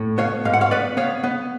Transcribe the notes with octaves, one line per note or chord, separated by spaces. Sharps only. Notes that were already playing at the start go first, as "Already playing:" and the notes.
Already playing: A2
B3 C#5 F5
G#2 F5
F#5
C#5 F5
B3 B4 D5
B3 C#5 F5
B3